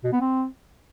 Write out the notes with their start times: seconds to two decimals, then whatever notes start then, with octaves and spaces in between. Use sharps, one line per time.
0.04 B2
0.12 B3
0.20 C4